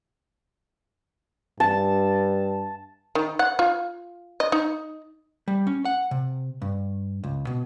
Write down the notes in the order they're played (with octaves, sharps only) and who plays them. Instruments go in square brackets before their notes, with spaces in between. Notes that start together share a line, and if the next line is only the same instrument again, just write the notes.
[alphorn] G2 [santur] A5
[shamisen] D#3
F#5
F4
D#5
D#4
[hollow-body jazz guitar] G3
C#4
F#5
C3
G2
C#2
B2